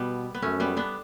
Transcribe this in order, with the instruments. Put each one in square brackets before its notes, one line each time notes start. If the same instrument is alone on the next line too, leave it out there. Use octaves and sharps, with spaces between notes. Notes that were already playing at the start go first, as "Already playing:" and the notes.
Already playing: [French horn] B2 [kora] G3 B3
[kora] B3
[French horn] F#2 [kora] A3 C#4
[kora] G3 B3
B3 D4